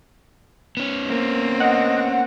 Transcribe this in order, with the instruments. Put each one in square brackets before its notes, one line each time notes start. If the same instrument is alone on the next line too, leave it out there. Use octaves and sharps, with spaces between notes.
[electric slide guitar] B3 C#4
[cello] A#3 C4
[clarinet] D#5 [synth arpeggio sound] F#5